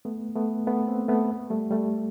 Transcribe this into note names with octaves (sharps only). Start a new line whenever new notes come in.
A3 B3
A3 B3
A3 B3
A#3 C4
A3 B3
G3 A3
G3 A3